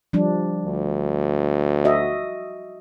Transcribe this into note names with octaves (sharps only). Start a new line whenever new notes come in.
F3 G3 D4
D2
F#4 D#5 E5